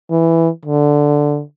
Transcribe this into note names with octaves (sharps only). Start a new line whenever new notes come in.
E3
D3